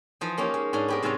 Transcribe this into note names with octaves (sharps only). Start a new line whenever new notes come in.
E3 F3 D#4
A#3 C#4 D#4 G4
G#3
G#2 C#4 D4 G#5
B3 G4 A#4
G#2 C3 F#3 C#4 F4 C#5